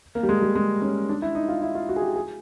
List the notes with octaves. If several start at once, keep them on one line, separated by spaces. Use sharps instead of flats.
A#3
G3
G#3
G3
G#3
C#4
D4
E4
D#4
F4
E4
F4
F#4
G#4
G4
G#4